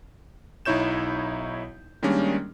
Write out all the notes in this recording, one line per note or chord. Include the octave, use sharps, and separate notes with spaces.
B1 D#4 E4 C#5 G6 E7
D#3 G3 G#3 A#3 C#4 D4